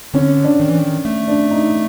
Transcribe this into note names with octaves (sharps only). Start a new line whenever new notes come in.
D3 C#4
D4
D#3
E3
D#3
A3
D4
D#4